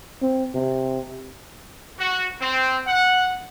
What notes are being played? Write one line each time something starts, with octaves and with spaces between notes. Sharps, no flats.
C4
C3
F#4
C4
F#5